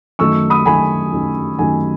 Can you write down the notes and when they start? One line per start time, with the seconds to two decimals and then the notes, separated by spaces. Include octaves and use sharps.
0.19 F#2 D#3 F#3 A3 D#4 C#6 E6
0.50 B5 D#6
0.65 F#2 D#3 F#3 A3 D#4 G#5 B5
1.12 F#2 D#3 F#3 A3 D#4
1.59 F#2 D#3 F#3 A3 D#4 G#5